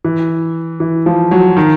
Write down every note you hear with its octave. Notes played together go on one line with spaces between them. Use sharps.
E3
E3
F3
F#3
D#3